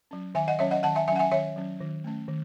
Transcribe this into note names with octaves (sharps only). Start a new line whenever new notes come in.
F#3 C#4
D#3 E5 G#5
D#5 F#5
F#3 C#4 C#5 E5
D#5 F#5
D#3 F#5 A5
E5 G#5
F#3 C#4 E5 F#5 G#5
E5 G#5
D#3 C#5 E5
F#3 C#4
D#3
A3 C#4
D#3